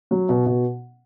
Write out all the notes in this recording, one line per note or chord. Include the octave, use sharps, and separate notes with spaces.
F#3
B2
B2